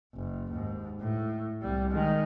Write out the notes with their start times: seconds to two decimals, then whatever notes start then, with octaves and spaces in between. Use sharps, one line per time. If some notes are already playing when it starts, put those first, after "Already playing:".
0.15 F#1
0.51 D#2 G#2
1.01 A2
1.62 C2 G3
1.90 D#3 G#3